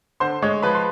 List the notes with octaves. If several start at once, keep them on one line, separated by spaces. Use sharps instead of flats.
D3 C5 C6
G#3 C#5 C#6
F3 B4 B5
C6